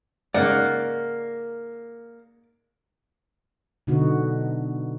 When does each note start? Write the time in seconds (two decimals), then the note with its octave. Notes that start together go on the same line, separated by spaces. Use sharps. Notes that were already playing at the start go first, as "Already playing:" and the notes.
0.34 G#2 C#3 A#3 D5 F#5
3.87 B2 D3 B3 D#4 F#4